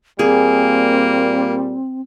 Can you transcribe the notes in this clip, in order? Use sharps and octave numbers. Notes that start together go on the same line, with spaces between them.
A#2 G3 A#3 C4 G#4